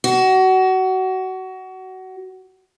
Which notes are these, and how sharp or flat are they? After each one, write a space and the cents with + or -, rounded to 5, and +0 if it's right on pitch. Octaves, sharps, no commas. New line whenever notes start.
F#4 +25